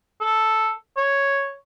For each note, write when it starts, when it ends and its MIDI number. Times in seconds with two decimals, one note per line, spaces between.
0.21 0.71 69
0.97 1.55 73